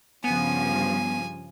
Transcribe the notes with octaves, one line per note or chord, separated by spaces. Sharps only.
G2 C#3 F3 B3 G#5